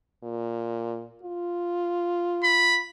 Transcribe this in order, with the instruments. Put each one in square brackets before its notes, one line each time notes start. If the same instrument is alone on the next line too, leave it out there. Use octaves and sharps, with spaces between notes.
[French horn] A#2
F4
[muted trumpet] B5